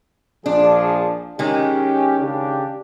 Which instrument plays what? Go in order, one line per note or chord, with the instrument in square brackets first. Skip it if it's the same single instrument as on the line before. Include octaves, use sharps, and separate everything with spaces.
[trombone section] A#1 F3 G#4 [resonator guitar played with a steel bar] D4
[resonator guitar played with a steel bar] D#3 G#3 [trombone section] C#4 G4
[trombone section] C#3 D4 G4